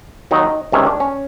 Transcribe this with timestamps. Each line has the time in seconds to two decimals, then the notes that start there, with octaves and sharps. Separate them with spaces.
0.31 D#2 D#3 F#3 D#4
0.72 C#2 C3 D#3 C#4
0.86 D4
1.00 C#4